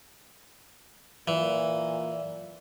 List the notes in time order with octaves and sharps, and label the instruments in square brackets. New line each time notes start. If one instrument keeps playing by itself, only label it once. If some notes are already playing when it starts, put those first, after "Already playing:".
[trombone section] A#2 [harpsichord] E3